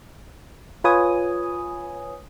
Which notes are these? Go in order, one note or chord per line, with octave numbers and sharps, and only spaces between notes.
F4 B4 C#5 G#5 D#6